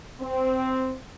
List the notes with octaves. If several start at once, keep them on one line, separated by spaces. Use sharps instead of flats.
C4